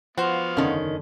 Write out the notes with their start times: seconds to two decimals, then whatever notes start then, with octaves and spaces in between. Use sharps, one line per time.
0.18 F3 B3 F#4 C5 F5
0.57 F#1 E2 D3 D#3 C#4